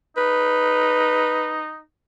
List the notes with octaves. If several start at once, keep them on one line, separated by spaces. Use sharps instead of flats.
D#4 B4